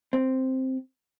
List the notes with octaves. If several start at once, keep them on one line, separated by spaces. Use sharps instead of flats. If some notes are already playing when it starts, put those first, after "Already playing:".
C4